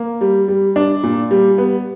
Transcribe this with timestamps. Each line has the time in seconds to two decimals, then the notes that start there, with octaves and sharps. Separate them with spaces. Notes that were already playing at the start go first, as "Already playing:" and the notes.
Already playing: A#3
0.21 G3
0.48 G3
0.76 D4
1.03 A#2
1.31 G3
1.58 B3